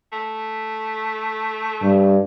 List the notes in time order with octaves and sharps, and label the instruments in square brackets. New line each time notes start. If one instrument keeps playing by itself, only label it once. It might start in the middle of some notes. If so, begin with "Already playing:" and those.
[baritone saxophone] A3
[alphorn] G2